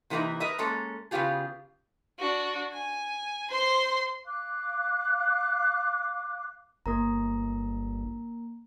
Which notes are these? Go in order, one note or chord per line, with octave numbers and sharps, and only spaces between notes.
C3 E3 A#3 B3 D#4 E4
A#4 B4 D#5 E5
G#3 A#3 C#4 A4
C#3 B3 D#4 F4 G4 G#4
D4 F#4
G#5
C5 C6
F5 D6 F#6
G1 A#3 A#4 A#5